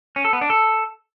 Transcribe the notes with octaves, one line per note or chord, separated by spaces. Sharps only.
C#4
A4
B3
D4
A4